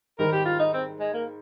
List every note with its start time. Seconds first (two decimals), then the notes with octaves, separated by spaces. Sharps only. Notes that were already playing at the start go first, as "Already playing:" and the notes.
0.19 G#2 D#3 G3 A#4
0.32 G4
0.45 F4
0.59 D#4
0.73 C4
1.00 G#3
1.14 A#3